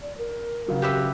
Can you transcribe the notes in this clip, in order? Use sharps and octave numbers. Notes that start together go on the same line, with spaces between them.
D5
A#4
C#3 F#3
G4 B4 E5